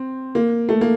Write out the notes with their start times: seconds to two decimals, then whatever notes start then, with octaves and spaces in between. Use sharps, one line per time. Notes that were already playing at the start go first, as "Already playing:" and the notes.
Already playing: C4
0.35 A#3
0.69 A3
0.81 A#3